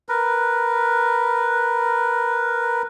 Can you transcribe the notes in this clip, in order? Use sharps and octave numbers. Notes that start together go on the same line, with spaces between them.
A#4 B4